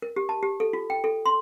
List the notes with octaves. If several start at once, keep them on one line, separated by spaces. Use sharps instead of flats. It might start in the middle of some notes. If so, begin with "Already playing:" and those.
A#4
G4
A5
G4
A4
F4
G5
A4
C6